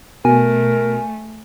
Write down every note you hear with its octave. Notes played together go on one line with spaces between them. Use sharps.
B2 A3 A#4 G#5